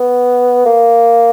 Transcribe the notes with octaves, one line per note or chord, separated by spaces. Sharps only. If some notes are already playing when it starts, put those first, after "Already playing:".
Already playing: B3
A#3